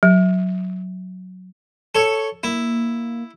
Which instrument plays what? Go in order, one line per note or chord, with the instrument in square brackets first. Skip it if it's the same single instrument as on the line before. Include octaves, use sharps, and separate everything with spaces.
[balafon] F#3
[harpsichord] A4 C#5
[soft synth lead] A#3 [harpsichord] E4